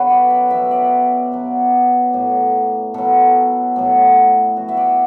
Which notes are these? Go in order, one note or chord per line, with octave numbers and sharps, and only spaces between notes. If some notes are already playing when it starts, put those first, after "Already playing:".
Already playing: F#2 B2 D3 F#3 B4
D5
E5
B2 F#3 E5
D5
B2 F#3
A2 F#3
B2 F#3 A4
A2 F#3
B2 F#3 F#4
E5
D5